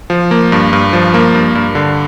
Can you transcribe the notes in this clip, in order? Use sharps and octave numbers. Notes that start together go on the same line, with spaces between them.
F3
A#3
G2
G2
F3
A#3
G2
G2
D3